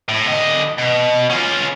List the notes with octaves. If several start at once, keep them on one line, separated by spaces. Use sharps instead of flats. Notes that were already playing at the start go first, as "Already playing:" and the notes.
A2
D3 D#5
B2
C#4 F4